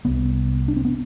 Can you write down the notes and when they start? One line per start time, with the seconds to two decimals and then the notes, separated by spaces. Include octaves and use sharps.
0.05 C2 C3 B3
0.68 D4
0.76 C4
0.85 B3